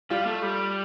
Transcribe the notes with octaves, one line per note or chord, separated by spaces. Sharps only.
G3 F4
A3
G3